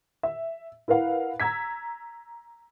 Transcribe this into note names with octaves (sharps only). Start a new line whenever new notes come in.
E5
E4 A#4 B4 F5 F#5
A#5 E6 G#6 B6